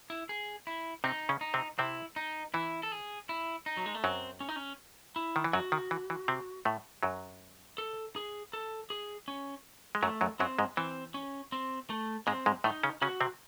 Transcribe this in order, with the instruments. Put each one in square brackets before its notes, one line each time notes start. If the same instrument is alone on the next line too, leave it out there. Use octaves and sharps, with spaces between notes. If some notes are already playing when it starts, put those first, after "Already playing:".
[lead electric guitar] E4
G#4
E4
[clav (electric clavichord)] C3 C4 [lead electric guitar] D#4
[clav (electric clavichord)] C#3 C#4
[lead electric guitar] D#4
[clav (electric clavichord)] C3 C4
[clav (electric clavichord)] C3 C4 [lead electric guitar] E4
[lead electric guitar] D#4
[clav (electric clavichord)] E3 [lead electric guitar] E4
[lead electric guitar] A4
G#4
E4
D#4
F#3
G#3
A3
[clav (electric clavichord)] F#2 F#3 [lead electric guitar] C4
[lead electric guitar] C#4
D#4
C#4
E4
[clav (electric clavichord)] D#3
E3
[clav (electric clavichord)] F#2 F#3 [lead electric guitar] F#4
[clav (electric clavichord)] D#3
E3
E3
C3 C4
A2 A3
F#2 F#3
[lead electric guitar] A4
G#4
A4
G#4
C#4
[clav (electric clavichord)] G#3
[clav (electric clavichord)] F#2 F#3 [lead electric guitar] A3
[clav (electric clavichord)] F#2 F#3
[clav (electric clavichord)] F#2 F#3 [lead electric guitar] C4
[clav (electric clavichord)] G#2 G#3
[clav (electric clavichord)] E3 [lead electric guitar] C4
[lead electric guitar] C#4
C4
A3
[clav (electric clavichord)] G#2 G#3 [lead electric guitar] C4
[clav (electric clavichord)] G#2 G#3
[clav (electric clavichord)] A2 A3 [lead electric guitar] D#4
[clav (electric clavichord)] C#3 C#4
[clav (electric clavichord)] C#3 C#4 [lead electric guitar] F#4
[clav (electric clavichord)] C3 C4